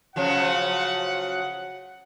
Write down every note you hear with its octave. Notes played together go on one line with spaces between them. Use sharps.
C#3 F3 F#3 F#5